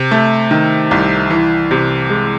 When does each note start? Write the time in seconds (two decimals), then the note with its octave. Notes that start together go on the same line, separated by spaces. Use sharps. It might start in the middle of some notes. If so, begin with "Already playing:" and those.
Already playing: C3
0.11 A3
0.51 D#3
0.91 C2
1.30 E3
1.71 C3
2.10 G#3